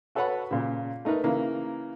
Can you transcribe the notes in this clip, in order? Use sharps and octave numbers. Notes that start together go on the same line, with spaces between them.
F#4 A4 B4 C#5 F#5 B5
A#2 C#3
A3 D#4 A#4 B4
C#3 E3 A#3